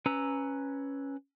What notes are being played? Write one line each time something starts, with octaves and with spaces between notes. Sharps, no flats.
C#4 B4 A#5 E6